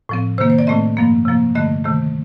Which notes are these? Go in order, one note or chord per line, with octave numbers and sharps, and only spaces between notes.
A2 F3 C4
C3 D#3 A#3 C5
C5
D5
A2 A3 C4 D#5
G2 F3 A#3
C3 F3 A#3
G2 D3 A3 D#5
C3 D#3 A3